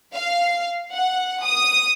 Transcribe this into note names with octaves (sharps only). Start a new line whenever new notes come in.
F5
F#5
D#6